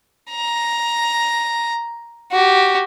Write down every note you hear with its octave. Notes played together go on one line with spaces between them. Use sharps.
A#5
F#4 G4